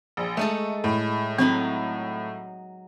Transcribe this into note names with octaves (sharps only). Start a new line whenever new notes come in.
A#1
G#3 A3 D#4 A4
A2
F#3 C4 D#4 B5